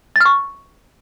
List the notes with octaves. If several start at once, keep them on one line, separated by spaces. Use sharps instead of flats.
C#6 F6 A6